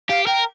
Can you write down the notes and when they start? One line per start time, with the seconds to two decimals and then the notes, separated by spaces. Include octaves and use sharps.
0.09 G4 F5
0.27 A#4 G5